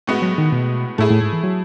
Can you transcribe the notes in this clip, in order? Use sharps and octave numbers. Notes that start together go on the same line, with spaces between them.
A2 G#3 B3 F#4
F#3
D#3
B2
A2 A3 E4 G#4
A2
G#2
E3
F#3